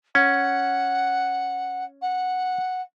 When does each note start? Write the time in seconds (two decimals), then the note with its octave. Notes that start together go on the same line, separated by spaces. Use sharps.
0.15 C#4 F#5
2.02 F#5